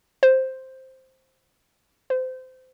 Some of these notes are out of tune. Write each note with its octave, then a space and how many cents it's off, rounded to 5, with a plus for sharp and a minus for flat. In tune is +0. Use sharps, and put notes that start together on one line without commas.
C5 +5
C5 -25